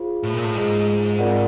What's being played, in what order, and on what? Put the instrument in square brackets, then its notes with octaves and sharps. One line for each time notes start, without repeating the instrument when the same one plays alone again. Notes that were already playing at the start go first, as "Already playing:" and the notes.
Already playing: [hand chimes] F4 G#4 C5
[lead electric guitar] A2
A#2
A2
[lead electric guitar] G#2 [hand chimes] F4 G#4 C5
[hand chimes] C4 F4 A#4 D5 F#5